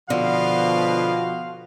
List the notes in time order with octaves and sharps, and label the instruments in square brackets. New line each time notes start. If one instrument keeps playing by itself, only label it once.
[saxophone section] B2 F3 [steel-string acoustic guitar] D3 [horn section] F#4 F5 C6